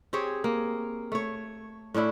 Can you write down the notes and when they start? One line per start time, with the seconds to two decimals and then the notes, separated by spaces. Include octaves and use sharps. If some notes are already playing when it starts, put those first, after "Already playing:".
0.13 C4 G4 G#4 C#5
0.44 A#3
1.12 A3 C#5
1.94 A2 C#4 D4 E4